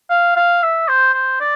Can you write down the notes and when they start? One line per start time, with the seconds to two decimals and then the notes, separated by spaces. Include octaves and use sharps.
0.10 F5
0.36 F5
0.63 E5
0.88 C5
1.14 C5
1.40 D5